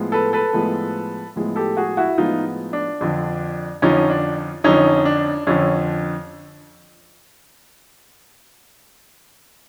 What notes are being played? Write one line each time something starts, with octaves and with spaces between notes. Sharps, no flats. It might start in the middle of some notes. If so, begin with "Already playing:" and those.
Already playing: A2 F3 G#3 B3
A4 B4
A4 B4
A2 F3 G#3 B3
A2 F3 G#3 B3
G4 A4
F#4 G#4
E4 F#4
A2 F3 G#3 B3 D#4 F4
D4
F2 D3 F3
F2 D3 F3 C#4 D#4
D4
F2 D3 F3 C#4 D#4
D4
F2 D3 F3 C#4